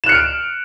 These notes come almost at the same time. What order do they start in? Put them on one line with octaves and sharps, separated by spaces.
E7 F#6 C#7 F6 D7